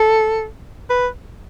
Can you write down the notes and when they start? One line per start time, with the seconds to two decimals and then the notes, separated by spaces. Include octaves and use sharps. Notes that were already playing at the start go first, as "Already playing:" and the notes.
Already playing: A4
0.90 B4